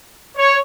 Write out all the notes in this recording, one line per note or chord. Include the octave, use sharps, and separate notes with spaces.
C#5